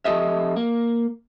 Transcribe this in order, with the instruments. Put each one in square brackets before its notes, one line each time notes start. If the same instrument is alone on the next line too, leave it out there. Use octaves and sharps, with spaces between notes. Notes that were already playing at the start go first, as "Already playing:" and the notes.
[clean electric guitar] F2 C#3 G4 A4 D#5 E5
A#3